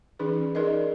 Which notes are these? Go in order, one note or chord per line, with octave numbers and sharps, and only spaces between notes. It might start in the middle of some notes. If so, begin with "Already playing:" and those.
E3 C#4 D#4 G#4 B4
D#4 G#4 A#4 D5 D#5